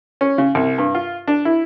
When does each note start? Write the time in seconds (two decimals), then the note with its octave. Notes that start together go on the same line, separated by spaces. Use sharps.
0.21 C#4
0.38 C#3
0.55 C2
0.78 G2
0.95 F4
1.28 D4
1.45 E4